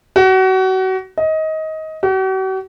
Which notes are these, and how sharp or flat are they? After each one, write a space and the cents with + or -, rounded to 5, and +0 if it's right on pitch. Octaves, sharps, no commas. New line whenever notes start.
F#4 +30
D#5 +20
F#4 +45